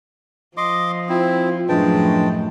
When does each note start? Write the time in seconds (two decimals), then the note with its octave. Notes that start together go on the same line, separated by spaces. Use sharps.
0.57 F3 D#5 C6 D6
1.09 C4 E4 F4
1.69 F#2 A2 F3 G#3 D4 B4 G5 A5